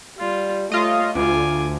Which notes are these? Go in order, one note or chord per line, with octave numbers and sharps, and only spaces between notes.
G3 F4
A3 F4 C#5 D#5
D2 F4 G#5 D6